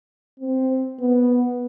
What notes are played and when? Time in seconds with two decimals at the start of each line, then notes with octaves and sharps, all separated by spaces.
0.40 C4
1.00 B3